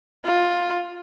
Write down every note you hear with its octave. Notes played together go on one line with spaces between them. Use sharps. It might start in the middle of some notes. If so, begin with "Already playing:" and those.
F4